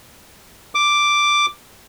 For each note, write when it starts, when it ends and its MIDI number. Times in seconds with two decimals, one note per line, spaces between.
0.75 1.46 86